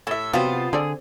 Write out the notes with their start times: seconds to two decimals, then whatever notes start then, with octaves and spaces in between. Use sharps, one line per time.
0.07 A2 A4 E5
0.34 C3 F3 F#3 B3 C4 F4 C5 A5
0.73 D3 C4 G#4 A4 D5